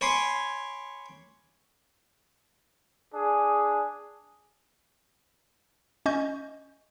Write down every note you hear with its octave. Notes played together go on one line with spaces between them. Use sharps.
C#5 G#5 B5 C6 D6
D4 G#4
C#4 D#5 C#6 G6